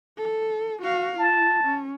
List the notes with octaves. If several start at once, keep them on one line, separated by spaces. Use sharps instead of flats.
A4
F#4 F5
F4 A5
C#4